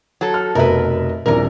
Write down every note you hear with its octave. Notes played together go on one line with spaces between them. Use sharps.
F#3 A4
F6
F1 B2 A#4 B4 E5
D#1 A#1 E3 C4 A#4